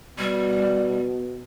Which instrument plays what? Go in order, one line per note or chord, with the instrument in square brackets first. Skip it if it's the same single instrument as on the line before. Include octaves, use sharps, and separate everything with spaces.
[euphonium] B2 [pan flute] G3